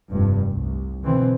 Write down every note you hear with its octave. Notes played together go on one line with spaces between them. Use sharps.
F1 G2
C2
B2 D3 E3 C4